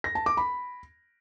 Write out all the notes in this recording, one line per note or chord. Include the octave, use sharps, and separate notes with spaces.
A#6
A5
D6
B5